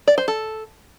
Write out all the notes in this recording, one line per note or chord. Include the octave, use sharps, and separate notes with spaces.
D5
C5
A4